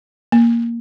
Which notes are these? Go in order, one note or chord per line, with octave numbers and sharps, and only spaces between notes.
A#3